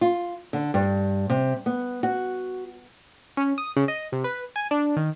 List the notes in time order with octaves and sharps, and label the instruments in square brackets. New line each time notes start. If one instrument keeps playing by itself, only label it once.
[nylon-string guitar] F4
D3
G2
C3
B3
F#4
[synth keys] C#4
D#6
C#3
D#5
C3
B4
G#5
D4
D#3